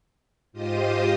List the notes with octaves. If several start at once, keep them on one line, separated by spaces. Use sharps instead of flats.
G#2 F4 G4 C5 D#5 D#6